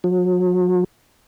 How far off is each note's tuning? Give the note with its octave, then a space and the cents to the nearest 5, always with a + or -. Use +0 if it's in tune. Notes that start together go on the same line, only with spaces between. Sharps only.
F#3 -40